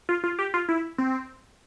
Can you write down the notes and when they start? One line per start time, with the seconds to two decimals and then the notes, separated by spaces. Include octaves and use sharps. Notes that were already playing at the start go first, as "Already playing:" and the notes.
0.09 F4
0.24 F4
0.39 G4
0.54 F4
0.69 E4
0.98 C4